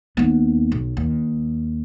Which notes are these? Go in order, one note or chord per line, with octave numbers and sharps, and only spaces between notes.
D#2 B3
B1
D#2